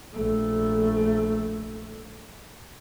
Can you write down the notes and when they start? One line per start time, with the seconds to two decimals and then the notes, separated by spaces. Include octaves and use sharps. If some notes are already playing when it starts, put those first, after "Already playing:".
0.14 A#1 A3